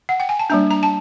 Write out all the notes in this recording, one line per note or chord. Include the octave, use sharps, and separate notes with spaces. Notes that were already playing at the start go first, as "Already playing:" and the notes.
F#5
G5
G#5
A5
G3 A#3 D4 A#5
A#5
A5